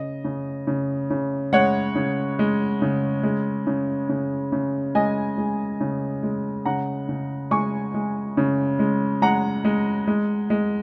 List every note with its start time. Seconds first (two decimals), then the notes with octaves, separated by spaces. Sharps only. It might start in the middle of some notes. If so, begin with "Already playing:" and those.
Already playing: C#3 D#5
0.25 C#3
0.67 C#3
1.10 C#3
1.53 G#3 C#5 F#5
1.96 C#3
2.39 G#3
2.82 C#3
3.23 G#3
3.67 C#3
4.09 C#3
4.52 C#3
4.95 G#3 D#5 G#5
5.38 G#3
5.81 C#3
6.23 G#3
6.66 C#3 F#5 A#5
7.09 C#3
7.51 G#3 G#5 C#6
7.94 G#3
8.37 C#3
8.79 G#3
9.22 G#3 F#5 A#5
9.65 G#3
10.07 G#3
10.50 G#3